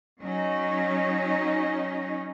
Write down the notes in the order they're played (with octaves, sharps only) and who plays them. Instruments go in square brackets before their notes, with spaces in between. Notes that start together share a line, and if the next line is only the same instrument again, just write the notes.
[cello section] F#3 C#4 D#4